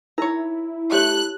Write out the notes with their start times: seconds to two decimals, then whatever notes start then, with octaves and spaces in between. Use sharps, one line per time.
0.18 D#4 E4 A#4 C#5 A#5
0.92 A3 G4 C#5 F#6